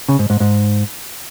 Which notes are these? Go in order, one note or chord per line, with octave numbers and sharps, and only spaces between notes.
C#3
G#2
G#2
G#2